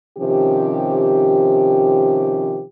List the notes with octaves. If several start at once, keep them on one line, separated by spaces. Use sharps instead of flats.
C3 D#3 F3 C#4 G4